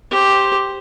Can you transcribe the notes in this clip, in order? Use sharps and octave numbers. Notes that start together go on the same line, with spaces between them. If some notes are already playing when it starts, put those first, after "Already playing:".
G4 C5